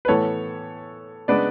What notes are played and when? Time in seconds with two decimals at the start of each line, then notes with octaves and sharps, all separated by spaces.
0.05 B4
0.08 A2 E3 B3 A4 C#5
1.28 C#3 G#3 B3 D4 B4 D5